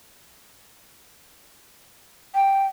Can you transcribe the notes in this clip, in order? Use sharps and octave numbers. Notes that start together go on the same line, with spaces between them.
G5